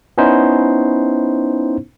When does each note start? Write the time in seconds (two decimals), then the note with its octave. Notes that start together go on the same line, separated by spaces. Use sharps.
0.18 B3 C#4 D#4 E4 C5